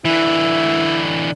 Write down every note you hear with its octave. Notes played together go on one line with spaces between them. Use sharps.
D3 E3 E4